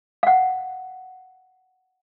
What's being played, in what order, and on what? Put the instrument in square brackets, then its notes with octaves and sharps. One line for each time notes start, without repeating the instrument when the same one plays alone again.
[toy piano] F5 F#5